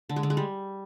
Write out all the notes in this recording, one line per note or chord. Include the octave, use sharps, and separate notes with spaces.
D3
G#3
D3
G#3
G3